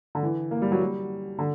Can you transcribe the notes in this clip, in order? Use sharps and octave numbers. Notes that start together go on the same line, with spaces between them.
D3
E3
A#3
G3
F#3
G3
D3